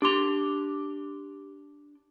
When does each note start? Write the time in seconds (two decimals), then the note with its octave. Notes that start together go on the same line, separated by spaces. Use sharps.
0.02 D4 G4 C6 D6 F7